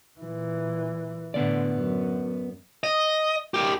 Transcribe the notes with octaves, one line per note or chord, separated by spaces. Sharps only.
A#2 E3
A2 D3 B3 D5
F#2
D#5
G4 A#4